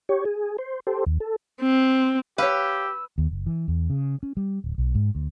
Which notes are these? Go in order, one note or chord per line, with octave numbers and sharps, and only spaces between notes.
G4 C#5
G#4
C5
G4 A4 C5
D#2
A4
C4
G4 B4 C#5 F5 E6
D#2
F#1
E3
E2
C#3
C#4
G3
D1
B1
G#2
D2